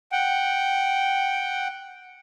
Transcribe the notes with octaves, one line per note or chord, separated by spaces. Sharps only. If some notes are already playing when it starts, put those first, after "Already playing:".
F#5 G5